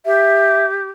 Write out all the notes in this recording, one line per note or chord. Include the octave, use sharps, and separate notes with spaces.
G4 E5